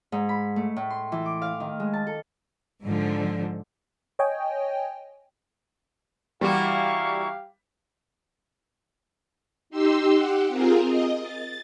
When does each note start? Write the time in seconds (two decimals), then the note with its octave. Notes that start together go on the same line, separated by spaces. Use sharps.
0.12 G#2
0.29 B5
0.56 A3
0.76 A2
0.90 C6
1.12 E3
1.25 D6
1.42 F5
1.60 D#3
1.80 G#3
1.94 A5
2.07 A4
2.83 G#2 D3 F3
4.19 C#5 D#5 G5 G#5
6.41 E3 G3 A#3 F#4 G4 F5 C#6
9.70 D#4 G4 C6 E6
10.11 G4 F#5
10.48 C4 F4 G#4 A#4
10.86 D#5
11.21 A6